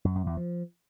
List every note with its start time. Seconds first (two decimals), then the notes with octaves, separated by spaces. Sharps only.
0.05 F#2
0.15 F#2
0.26 E2
0.37 F3